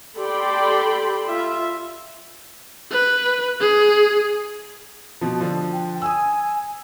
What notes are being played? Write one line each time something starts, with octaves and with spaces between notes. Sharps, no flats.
G4 A4 D5 G5 B5 C6
F4 E5
B4
G#4
B2 F3
D3 F3
G5
G#5 D#6 E6